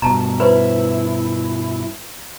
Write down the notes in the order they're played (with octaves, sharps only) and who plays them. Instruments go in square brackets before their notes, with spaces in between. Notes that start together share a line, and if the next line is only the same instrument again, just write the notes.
[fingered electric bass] G2 B2 [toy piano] A5 A#5
[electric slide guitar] E4 [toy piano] B4 C5